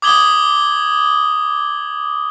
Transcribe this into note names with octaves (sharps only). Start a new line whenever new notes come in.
D6 D#6 G#6 F#7 G7